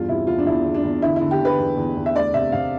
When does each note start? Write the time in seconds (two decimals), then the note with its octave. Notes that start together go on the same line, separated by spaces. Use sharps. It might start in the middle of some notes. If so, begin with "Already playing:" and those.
Already playing: E2 G2 F4
0.08 C3 E4
0.27 E2 F4
0.39 D4
0.46 E2 E4
0.65 E2
0.74 D4
0.84 E2
1.02 D3 E4
1.16 E4
1.21 D3
1.31 G4
1.40 D3 B4
1.59 E2
1.77 E2
1.96 E2
2.06 E5
2.15 D2 D5
2.34 C3 E5
2.52 C3 F5